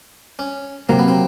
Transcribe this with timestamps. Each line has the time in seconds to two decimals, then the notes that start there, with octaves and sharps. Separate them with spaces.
0.39 C#4
0.89 C3 D#3 F#3 A#3 C4
0.99 B3
1.08 C4